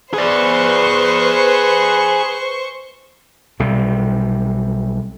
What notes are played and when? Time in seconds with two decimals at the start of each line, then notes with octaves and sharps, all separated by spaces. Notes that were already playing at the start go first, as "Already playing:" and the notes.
0.14 G#4 B4 C5 D5 C#6
3.59 B1 C3 G3